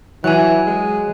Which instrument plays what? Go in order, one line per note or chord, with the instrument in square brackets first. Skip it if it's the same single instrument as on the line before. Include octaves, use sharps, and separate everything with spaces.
[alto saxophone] E3 [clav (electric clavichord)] F#3 [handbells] G#5 F#6
[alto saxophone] G#3